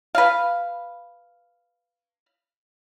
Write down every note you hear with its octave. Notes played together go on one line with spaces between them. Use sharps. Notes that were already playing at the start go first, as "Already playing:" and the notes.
B4 F5